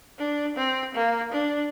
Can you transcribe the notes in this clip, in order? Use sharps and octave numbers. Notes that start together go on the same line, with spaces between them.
D4
C4
A#3
D4